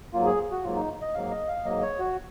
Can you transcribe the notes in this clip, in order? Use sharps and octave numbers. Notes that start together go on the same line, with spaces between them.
G#2 F#3 A#3 F4
G#4
F#4
G#2 F#3 A#3 F4
D#4
D#5
G#2 F#3 A#3 F5
D#5
F5
G#2 F#3 A#3 D#5
C#5
F#4